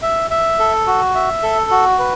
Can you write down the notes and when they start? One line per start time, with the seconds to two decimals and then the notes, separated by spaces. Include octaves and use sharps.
0.02 E5
0.30 E5
0.59 A4
0.87 F#4
1.15 E5
1.43 A4
1.71 F#4
1.99 B4